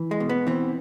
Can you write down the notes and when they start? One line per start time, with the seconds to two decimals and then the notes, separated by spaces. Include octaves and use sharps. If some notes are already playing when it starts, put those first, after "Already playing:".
Already playing: E3
0.11 G#3
0.20 B2
0.29 B3
0.47 E3 C4